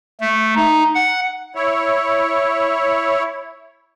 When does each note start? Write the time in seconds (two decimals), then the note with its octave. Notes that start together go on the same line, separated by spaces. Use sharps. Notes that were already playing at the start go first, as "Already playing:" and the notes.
0.21 A3
0.56 D#4
0.95 F#5
1.55 E4 C#5